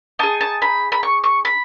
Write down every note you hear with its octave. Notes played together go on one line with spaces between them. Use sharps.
D#4 G#4 A5
A5
B5
B5
C#6
C#6
B5